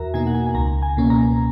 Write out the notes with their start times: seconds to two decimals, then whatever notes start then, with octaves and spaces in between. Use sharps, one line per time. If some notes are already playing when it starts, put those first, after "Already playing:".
Already playing: E2 F#4 A#4 E5 A#5
0.14 B2 A#3 D#4 G#5
0.27 F#5
0.35 G#5
0.47 G#5
0.55 C#2 A#5
0.82 G#5
0.97 B2 A#3 C#4
1.10 A#5